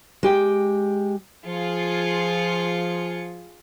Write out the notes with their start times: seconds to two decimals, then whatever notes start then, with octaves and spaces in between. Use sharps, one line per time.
0.23 G#3 G4 G5
1.46 F3 F4 G#4 C#7